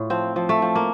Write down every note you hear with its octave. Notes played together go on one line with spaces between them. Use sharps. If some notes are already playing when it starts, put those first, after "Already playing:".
Already playing: A2 F4
F3 C4
F3
A3
F3
A#3